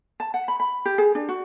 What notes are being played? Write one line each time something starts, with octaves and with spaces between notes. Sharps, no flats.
A5
F#5
B5
B5
G4
G#4
D4
F#4